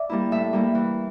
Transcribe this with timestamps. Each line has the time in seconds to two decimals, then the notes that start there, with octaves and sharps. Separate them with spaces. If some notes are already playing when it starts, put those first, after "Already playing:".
Already playing: D5 E5
0.09 G3 A#3 E4
0.31 A2 E5
0.53 G3 A#3 E4
0.75 E3